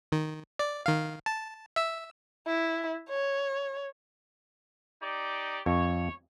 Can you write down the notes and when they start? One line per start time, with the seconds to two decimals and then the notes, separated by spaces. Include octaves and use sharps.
0.12 D#3
0.59 D5
0.86 D#3 F5
1.26 A5
1.76 E5 E6
2.47 E4
3.09 C#5
5.01 D#4 G4 D5
5.66 F2 C#5